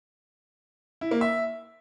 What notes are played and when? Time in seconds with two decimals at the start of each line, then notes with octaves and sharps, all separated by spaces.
1.01 E4
1.11 A#3
1.21 E5